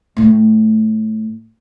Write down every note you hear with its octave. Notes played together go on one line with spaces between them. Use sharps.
A2 A3